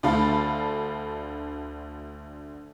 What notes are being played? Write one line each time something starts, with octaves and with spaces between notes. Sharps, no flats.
D2 D3 A3 A4 F5 B5